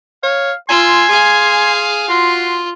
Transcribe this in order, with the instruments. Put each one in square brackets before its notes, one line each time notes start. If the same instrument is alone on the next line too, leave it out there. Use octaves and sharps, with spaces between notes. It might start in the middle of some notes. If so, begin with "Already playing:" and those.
[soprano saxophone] C#5 [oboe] F5
[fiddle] F4 E6 [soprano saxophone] G#5 [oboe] C6
[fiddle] G#4 F5
[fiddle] F4 [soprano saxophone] F#4 [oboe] C6